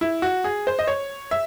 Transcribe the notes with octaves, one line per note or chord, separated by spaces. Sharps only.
E4
F#4
G#4
C5
D#5
C#5
E5